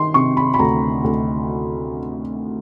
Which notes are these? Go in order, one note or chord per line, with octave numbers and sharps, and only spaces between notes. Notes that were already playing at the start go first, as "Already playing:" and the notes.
Already playing: D#3 C6
C3 C#6
B5
B5
D2 A#5
D2